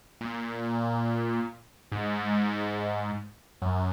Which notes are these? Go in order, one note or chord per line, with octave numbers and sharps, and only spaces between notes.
A#2
G#2
F#2